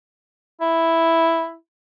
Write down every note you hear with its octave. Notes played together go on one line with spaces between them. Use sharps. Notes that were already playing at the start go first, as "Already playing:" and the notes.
E4